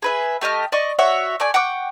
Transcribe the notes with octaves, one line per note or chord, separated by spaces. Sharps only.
G#4 B4 E5
A3 G4 D#5 F6
D5 D#5 C#6
F#4 C#5 E5
A3 D5 G#5
F#5 G5 C#6 D6